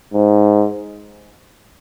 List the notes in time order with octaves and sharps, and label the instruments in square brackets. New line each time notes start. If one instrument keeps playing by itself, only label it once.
[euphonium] G#2